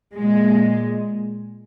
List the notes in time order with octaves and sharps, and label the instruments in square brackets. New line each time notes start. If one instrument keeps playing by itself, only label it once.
[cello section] A#2 G#3